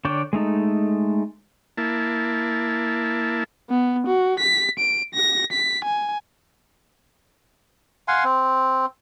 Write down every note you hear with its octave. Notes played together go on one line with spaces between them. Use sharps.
D3 D4 C#5 D5 G5
G#3 A3 D#4 A4
A#3 E4 A5
B3
F#4
B6
D7
A#6
B6
G#5
F5 F#5 G#5 C6
C4